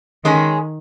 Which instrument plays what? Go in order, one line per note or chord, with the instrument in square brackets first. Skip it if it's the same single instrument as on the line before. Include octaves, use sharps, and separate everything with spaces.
[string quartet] D#3 [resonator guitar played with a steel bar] G#3 C#4 G#4